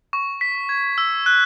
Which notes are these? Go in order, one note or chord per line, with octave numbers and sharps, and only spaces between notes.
C#6
B6
G#6
E6
F#6